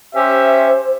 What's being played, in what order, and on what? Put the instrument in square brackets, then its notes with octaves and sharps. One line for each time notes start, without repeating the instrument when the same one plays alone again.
[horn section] C#4 G4 E5 [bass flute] C5